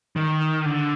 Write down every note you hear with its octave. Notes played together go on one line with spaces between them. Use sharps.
D#3
D3